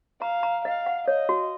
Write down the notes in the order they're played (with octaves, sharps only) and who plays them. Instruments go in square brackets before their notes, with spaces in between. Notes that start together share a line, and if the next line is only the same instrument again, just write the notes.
[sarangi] F5 [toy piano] A#5
[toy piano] A#5
[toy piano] D#5 [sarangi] F5
[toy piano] F#5
[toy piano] C#5 [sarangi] D#5
[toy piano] F#4